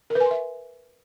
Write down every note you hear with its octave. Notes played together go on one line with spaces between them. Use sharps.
A#4
B4
G#5
C6
E5